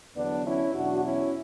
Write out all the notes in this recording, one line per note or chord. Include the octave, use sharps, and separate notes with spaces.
E2 D3 F#3 B3 D4
C#4 E4
E2 B2 F#3 D4 F#4
C#4 E4